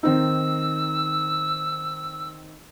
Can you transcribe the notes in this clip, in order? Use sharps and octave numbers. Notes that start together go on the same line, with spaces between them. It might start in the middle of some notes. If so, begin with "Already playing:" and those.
D#3 C4 D#4 E6